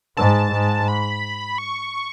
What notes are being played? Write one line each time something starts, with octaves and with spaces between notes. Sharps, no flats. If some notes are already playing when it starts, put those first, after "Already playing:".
G#2 A5
G#2
B5
C#6